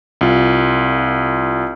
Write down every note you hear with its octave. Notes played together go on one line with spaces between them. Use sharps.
C2 F4